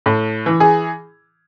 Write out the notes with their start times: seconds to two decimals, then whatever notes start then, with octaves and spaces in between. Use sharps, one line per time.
0.06 A2
0.46 E3
0.60 G#4